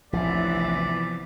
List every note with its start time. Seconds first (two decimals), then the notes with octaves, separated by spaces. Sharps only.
0.13 A1 D2 C3 E3 F3 B3 E4 D5